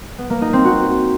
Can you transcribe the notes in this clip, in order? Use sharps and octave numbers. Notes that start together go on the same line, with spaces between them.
B3
A#3
D#4
C4
F#4